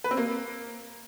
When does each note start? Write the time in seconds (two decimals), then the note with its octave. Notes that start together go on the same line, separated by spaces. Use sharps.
0.04 B4
0.11 C4
0.17 A#3